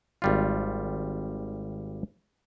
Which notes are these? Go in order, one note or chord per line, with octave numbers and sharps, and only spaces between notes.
G#1 G3 F4